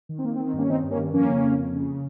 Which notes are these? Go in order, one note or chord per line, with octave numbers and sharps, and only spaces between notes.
D#3
C4
D#3 A#3
C4
D#3
C4
G2 A#3 C#4
C#4
D#3 C4 D#4
G2
A#3 C#4
G2
F2 A#3 C#4
C#3
F2
F2
C#3